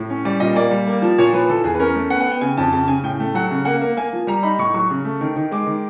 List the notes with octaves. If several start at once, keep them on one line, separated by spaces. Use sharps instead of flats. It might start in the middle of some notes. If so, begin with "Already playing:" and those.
Already playing: A2
C#4
G3 D5
A#2 D#5
A#3 D5
G3
A#3
F3
A#2 C#5
F3 B4
E3 A4
E2 G#4
B4
C#4 A#4
A3
B3 F#5
F#5
B3 G5
C#3 G#5
F2 A5
C#3 A5
C#3 G#5
A2 G5
A3
F#3 F#5
C#3
A#3 F#5
A#3
A#3 G#5
F3
G3 A#5
D#4 B5
A2 C#6
F#3 C#6
C#3
A3
D#3
D#3
G#3 D6
D#3